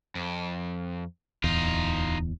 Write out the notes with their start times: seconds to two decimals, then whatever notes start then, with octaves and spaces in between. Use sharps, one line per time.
0.15 F2
1.44 D1 E2 D#4 F4